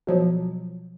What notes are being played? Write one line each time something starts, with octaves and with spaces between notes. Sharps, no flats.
B2 F3 F#3